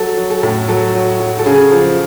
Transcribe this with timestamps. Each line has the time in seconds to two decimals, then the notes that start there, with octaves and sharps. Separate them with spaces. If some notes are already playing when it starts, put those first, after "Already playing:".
Already playing: F#3 A4
0.17 F#3
0.30 A4
0.43 A2
0.68 F#3 A4
0.94 F#3
1.20 F#3
1.39 A4
1.46 C#3 G#4
1.71 F3